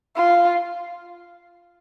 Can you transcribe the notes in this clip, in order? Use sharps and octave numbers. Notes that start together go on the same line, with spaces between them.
F4